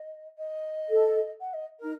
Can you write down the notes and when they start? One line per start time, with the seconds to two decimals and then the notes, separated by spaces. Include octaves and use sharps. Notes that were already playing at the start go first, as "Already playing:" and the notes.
Already playing: D#5
0.38 D#5
0.89 A4
1.40 F#5
1.53 D#5
1.79 D#4 A#4